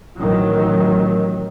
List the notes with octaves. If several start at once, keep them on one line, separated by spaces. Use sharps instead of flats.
A1 D#3 F#3